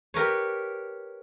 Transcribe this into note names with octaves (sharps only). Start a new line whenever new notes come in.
G4 A#4 B4 C#5